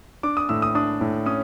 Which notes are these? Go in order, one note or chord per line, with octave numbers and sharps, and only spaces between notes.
D4 D6
D#6
A2 E6
D#6
D4 D#6
A2
C#4 D#6